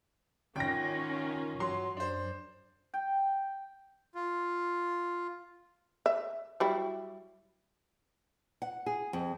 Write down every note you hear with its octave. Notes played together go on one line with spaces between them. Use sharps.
G#1 D#3 C#4 F4 G5 A#6
G2 F#3 C6
F#2 D4 C5
G5
F4
E5
F#3 G3 E4
F#5
G#4
F2